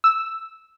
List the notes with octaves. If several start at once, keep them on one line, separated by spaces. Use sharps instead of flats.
E6